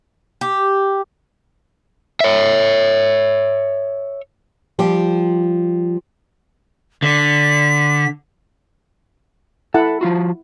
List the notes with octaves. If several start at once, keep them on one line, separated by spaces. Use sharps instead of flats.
G4
C#5 E5
F3 G3 G4
D3 B6
E4 A4 F#5
F3 F4 F#4